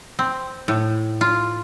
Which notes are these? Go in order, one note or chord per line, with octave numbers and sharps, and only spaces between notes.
C4
A2
F4